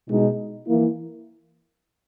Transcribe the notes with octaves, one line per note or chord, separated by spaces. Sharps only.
B2 G#3 D#4
E3 A#3 E4